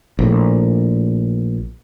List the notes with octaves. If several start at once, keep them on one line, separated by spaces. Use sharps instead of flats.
A#1 A2